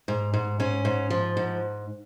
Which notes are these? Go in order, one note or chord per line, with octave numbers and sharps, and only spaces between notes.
G#2
G#2
G#2 C#4
G#2
F3
G#2